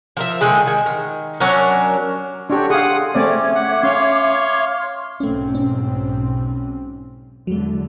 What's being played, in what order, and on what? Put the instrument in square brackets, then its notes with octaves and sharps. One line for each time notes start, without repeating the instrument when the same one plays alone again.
[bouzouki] F3 A#4 E5
D3 D#3 G#3 G#4
D#3 G#5
D#3
F#3 C#4 D4 A#4
[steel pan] D4 G4 [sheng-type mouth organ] F#4 C#5 [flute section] A4 C6
[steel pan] G#4 F5 [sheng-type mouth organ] F#5 D#6
[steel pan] A3 C4 D5 [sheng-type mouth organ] C#4 [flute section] E5 D6 G#6
[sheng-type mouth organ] F#5
[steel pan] C#4 [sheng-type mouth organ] C#5 F5 C6
[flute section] C6 F6
[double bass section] B1 G#2 C4 [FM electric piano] A3 C#4
[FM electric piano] C#4
[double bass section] E2 D3 [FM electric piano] F#3 G#3